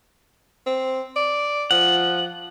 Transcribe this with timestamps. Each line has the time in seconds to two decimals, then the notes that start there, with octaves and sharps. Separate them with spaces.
0.66 C4
1.16 D5
1.71 F3 F#5